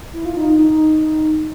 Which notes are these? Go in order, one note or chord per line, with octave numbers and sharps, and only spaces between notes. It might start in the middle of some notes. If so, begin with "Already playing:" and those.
E4
F4
D#4
D#4
D#4